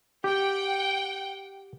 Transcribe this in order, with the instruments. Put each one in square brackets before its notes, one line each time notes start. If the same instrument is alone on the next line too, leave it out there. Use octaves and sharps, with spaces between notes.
[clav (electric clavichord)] G4 [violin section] F#5 G5